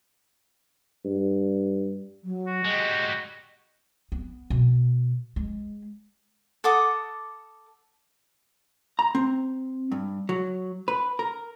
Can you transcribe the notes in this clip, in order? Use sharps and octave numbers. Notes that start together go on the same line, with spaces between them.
G2
F#3
F#4
G3 G#3 D#5
B3
B2
G#3
A4 F#5 D6 D#6
A#5
C4
G2
F#3
B4
A#4